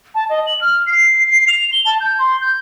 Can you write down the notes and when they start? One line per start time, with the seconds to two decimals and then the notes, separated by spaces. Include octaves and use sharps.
0.15 A5
0.29 D#5
0.46 F#7
0.61 F6
0.87 C7
1.26 C7
1.48 F7
1.72 G7
1.85 A5
2.00 G6
2.19 C6
2.41 G6